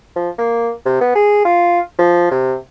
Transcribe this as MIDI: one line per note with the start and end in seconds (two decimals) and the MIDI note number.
0.16 0.30 53
0.38 0.71 58
0.86 0.99 48
1.01 1.11 59
1.15 1.43 68
1.45 1.80 65
1.99 2.31 53
2.31 2.55 48